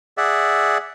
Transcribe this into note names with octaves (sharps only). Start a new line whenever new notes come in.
G#4 D5 E5 F#5